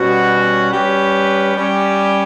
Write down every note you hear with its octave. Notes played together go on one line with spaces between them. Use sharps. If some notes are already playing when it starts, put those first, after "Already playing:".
Already playing: B2 G3 C#4 F#4
G3 C#4 G4 B4
G3 C#4 G4